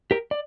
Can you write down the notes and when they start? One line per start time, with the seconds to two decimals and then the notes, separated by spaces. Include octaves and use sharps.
0.11 G4 A#4
0.31 D5